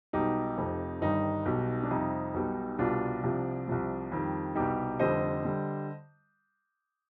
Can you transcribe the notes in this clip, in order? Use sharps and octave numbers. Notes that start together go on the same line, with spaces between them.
B1 B2 G3 D#4 G4
F1 F2 C3
G1 G2 D#3 G3 D#4
B1 B2 G3
D4
F2 C3 G3 D#4
B1 B2 G3
C2 B2 G3 D4 F4
C2 C3 F3
C2 C3 F3
F2 D#3 G3
C2 B2 G3 D#4 G4
F1 F2 D3 G3 C5 D#5
D3 G3